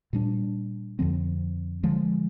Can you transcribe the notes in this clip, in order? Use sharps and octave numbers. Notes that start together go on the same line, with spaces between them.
A#2 G3 D4
F2 D3 F3 C4
D3 F3 G#3